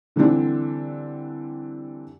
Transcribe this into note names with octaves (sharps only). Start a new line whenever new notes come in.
D3 E3 G3 C4 D4